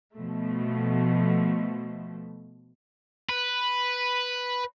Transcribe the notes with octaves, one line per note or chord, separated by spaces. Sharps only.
B2 F3 A3
B4